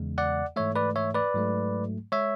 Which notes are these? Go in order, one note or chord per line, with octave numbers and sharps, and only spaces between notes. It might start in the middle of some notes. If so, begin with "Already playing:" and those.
Already playing: E2 C#3 G#3
D5 F#5
G#2 E3 A3 C#5 E5
B4 D5
C#5 E5
B4 D5
G#2 F#3 A3
G#3 C#5 E5